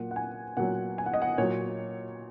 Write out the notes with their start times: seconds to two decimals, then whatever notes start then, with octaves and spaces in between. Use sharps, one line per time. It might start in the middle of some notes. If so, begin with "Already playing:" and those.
Already playing: A#2 F#3 F#5
0.11 F#5
0.16 G#5
0.57 A#2 F#3 F#5
0.98 G#5
1.06 F#5
1.14 D#5
1.22 F#5
1.38 A#2 F#3 C#5